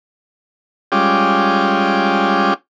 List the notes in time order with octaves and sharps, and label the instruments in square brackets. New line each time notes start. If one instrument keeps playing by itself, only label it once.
[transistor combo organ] G3 G#3 C#4 F4 G5 D6